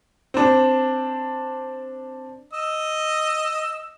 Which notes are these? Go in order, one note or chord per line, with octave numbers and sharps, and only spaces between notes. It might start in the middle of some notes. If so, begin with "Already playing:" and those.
C4 D4
D#5 E6